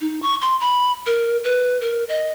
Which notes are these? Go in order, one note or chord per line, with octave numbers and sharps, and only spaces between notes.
D#4
C#6
C6
B5
A#4
B4
A#4
D#5